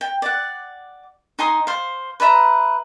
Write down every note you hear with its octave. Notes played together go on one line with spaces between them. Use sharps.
G5
D5 F#5
D#4 G#5 C6 D#6
C5 F5
B4 D5 E5 A#5